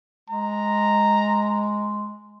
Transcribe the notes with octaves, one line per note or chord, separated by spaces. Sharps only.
G#3 A#5